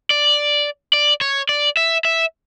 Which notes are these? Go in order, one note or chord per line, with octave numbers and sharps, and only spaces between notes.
D5
D5
C#5
D5
E5
E5